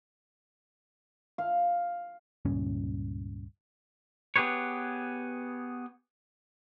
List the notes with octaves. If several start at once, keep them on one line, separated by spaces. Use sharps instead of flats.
F5
C#2 G2 A#2 C#4
B3 G4 G#4 B4 C#5